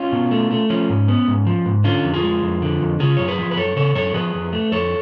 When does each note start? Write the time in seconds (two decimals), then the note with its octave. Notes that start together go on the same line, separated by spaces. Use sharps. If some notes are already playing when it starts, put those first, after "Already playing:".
Already playing: C#4 F4
0.12 B2
0.31 A3
0.51 A3
0.70 F3 C#4
0.89 G#2
1.08 B3
1.28 G#2
1.47 F3
1.66 G#2
1.84 D3 C#4 F4
2.04 F2
2.14 F4 G#4
2.23 G#3
2.42 F2
2.62 D3
2.81 F2
2.99 C#3 F4 G#4
3.17 F#2 C#5
3.28 G#4 B4
3.38 F3
3.51 B4
3.57 F#2 A4 C#5
3.76 C#3 A4 C#5
3.95 F#2 A4 C#5
4.14 F3 G#4 B4
4.34 F2
4.53 A3
4.72 F2 A4 C#5